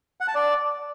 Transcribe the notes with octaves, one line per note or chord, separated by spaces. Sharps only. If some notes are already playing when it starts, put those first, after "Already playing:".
F#5
A5
D5